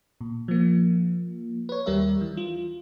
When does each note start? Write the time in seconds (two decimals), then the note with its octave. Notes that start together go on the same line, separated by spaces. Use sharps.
0.21 A#2
0.48 F3 A#3
1.69 B4 C#5
1.86 D#2 G3 G4 A#4 D5 E5
2.21 E3
2.37 F4